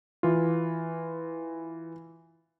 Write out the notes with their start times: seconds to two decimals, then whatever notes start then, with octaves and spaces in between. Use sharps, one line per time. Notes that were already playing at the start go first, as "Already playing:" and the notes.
0.23 E3 F4